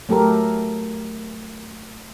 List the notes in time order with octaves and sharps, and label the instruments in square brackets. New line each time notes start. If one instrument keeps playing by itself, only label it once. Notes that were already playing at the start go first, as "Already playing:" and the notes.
[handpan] F#3 A3 G4 A4 A#4